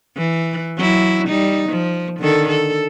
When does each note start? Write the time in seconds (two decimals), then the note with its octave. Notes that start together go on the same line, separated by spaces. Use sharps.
0.17 E3
0.77 F#3 E4
1.28 G3 D#4
1.69 F3
2.19 D3 D#3 A4
2.49 A4